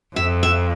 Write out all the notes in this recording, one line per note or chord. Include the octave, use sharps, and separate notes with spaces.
F2 E5
E5